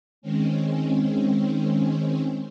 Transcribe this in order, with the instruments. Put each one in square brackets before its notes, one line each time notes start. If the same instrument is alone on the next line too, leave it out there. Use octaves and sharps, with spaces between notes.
[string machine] D#3 G#3 C4 C#4